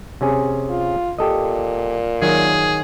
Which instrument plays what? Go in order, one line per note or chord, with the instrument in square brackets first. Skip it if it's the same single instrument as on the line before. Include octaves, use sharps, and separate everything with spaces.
[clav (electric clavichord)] C3 C#4 G#4
[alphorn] F4
[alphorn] A#2 [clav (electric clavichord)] G4 A4 D#5
[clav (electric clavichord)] D#3 F#3 [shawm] G#4